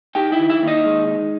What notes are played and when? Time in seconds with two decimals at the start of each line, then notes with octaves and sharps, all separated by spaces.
0.15 D#4 G4 G5
0.32 E4 E5
0.39 D#3
0.49 E4 E5
0.62 D#2
0.67 D#4 D#5
0.85 G#3
1.07 D#4